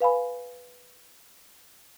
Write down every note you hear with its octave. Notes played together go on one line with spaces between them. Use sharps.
B4 F5 G#5 B5